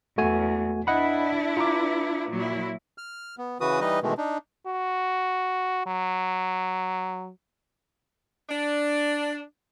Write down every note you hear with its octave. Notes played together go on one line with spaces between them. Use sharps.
E2 A3 F#4 G#5
D4 E4 B4 D#5 F#5 B5
F4 A#5 D6
A#2 F#3 E4
F6
B3
C#3 E3 F#4 B4 D#6
E3 G3 D#4 B4 D#5
B2 D#3 E3 G#3 A3
D4 D#4
F#4
F#3
D4